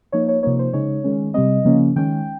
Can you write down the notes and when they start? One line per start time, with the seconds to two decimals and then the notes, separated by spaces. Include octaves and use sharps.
0.12 F3 A#3 D#4 C#5
0.29 C#5
0.43 C3 F3 A#3 D#4 C#5
0.59 C5
0.73 C#3 G#3 D#4 C#5
1.04 D#3 G#3 C#4
1.34 C3 G3 C4 D#5
1.65 C#3 F3 A#3 C#4
1.96 D#3 G#3 C#4 G5